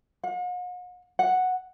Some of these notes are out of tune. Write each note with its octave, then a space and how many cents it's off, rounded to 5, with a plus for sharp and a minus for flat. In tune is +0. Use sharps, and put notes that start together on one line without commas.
F#5 -45
F#5 -5